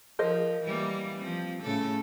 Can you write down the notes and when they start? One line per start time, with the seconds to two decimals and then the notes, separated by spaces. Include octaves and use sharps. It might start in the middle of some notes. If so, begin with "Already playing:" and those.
0.19 F3 A#4 C5 D#5
0.64 E3 G3 A#3
1.20 F3 C4
1.63 A2 C#3 A4